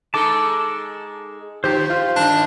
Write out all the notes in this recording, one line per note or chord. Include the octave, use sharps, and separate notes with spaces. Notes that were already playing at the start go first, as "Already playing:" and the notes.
G#3 D#4 A4 A5 D6
D#3 F3 G4 C5
F4
G2 D#3 D4